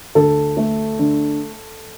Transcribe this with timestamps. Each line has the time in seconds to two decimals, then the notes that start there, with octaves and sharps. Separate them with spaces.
0.15 D2 A4
0.57 A3
0.99 D3